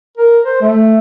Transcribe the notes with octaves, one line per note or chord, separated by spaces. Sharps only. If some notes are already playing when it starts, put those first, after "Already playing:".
A#4
C5
A3